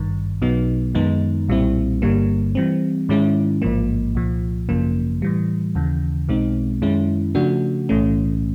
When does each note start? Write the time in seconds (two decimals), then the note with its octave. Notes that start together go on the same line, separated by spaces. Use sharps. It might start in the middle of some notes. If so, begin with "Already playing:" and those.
Already playing: G#1 G2 D#3
0.42 B1 B2 F#3 B3 D#4
0.95 F#2 D#3 G#3 B3 D#4
1.49 B1 A#2 G3 C4 E4
2.02 G1 G2 D3 G3 A#3
2.55 E3 G3 C4
3.09 G#2 D#3 G#3 C#4 E4
3.62 A1 G#2 F3 A#3
4.15 C2 A#2 F3
4.69 G#1 F#2 C#3 F3 A#3
5.22 A2 E3 G3
5.75 D#2 C#3 E3
6.29 B1 B2 G#3 C4 D#4
6.82 F#2 D#3 G#3 C#4 E4
7.35 C#3 F3 A3 D4 F#4
7.89 B1 A2 E3 A3 C#4